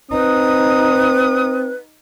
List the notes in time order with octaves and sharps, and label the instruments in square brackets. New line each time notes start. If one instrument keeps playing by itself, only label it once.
[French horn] C4 [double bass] D#4 [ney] B4 [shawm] D#6